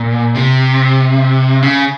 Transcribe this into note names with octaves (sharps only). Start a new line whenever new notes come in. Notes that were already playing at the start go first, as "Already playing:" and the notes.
Already playing: A#2
C3
C#3